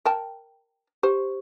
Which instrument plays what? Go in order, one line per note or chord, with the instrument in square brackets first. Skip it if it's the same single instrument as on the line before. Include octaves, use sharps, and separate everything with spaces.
[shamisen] A#4 G5 A5
[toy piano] G4 [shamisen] C5